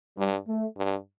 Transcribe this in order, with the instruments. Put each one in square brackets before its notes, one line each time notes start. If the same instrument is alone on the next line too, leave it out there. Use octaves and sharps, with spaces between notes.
[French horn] G2 [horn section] G3
[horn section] A3
[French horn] G2